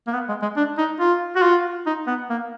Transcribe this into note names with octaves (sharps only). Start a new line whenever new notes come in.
A#3
B3
G#3
G#3
D4
D#4
F4
F#4
F4
D#4
B3
A#3